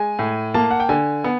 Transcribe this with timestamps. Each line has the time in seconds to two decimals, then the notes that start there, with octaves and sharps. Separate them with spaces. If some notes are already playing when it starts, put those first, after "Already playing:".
Already playing: G#3 G#5
0.19 A2
0.54 A#3 A5
0.71 F#5
0.80 G5
0.89 D3 G#5
1.24 B3